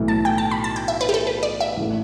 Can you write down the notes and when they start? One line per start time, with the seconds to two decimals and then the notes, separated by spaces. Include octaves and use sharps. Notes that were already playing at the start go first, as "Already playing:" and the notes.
Already playing: B1 A2 E3 A3
0.08 A5
0.25 G5
0.38 A5
0.51 B5
0.64 A5
0.76 G5
0.88 E5
1.01 B4
1.09 G4
1.14 A4
1.27 B4
1.43 D5
1.60 E5
1.77 A1 A2 A3